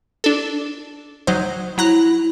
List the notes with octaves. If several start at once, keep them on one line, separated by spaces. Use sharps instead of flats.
D4 A4
F#3 D#4 C5
F#3 E4 A#5 F#6